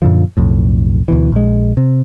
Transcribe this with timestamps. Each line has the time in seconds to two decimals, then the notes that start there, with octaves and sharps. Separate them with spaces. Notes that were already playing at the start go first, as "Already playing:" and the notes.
0.02 F#2 A#2 D3 F3
0.37 B1 F2 A2
1.08 D2 B2 E3
1.32 A#1 G#3
1.77 C3